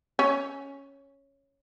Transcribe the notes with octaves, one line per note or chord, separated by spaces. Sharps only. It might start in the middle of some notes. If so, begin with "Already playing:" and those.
C#4